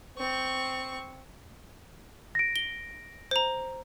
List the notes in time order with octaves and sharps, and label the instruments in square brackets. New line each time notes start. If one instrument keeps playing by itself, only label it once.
[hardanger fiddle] C4 C#6
[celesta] A#6 D7
[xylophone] G7
C5 A#5